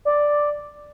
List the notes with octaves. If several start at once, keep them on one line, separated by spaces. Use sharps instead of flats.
D5